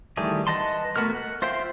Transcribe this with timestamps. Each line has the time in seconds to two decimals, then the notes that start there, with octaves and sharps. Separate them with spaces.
0.17 D#3 E3 G3 A3 G#4
0.47 B4 D#5 F#5 A5 C6
0.96 A3 B3 F#4 A#4 F6
1.15 F#5
1.42 F4 C5 E5 F5 G5